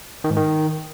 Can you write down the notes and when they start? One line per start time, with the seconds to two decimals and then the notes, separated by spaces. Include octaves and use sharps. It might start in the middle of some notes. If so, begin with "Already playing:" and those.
0.24 D#3
0.30 G#2
0.36 D#3